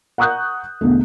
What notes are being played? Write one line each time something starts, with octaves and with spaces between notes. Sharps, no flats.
F#5 A#5 C#6 D#6 F#6 G6
B1 E2 D3 A3